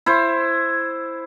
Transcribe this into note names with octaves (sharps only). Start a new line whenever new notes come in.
E4 C5